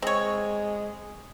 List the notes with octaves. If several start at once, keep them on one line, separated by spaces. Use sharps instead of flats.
G#3 C4 C#5